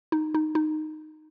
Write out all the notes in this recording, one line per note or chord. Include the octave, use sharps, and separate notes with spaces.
D#4
D#4
D#4